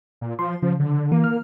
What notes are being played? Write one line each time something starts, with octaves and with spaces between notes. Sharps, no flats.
A#2
F3 C6
C#3 F3
D3
E3 A#3
F6